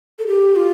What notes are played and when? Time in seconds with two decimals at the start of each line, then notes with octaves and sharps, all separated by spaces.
0.19 A4
0.27 G4
0.56 F4